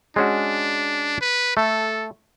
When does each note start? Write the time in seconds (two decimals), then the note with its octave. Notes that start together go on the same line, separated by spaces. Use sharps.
0.16 G#3 C#4 D4 F#4
1.21 B4
1.57 A3 A4